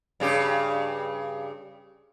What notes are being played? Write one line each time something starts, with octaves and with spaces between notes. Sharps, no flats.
G2 C#3 G4